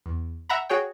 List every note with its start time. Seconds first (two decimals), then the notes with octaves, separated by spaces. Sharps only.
0.06 E2
0.50 E5 F#5 A#5 B5
0.69 F#4 G#4 C#5 G5